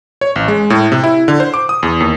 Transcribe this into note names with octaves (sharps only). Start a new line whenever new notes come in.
C#5
A1
G#3
A2
C3
E4
D3
C5
D6
D#6
E2
D#2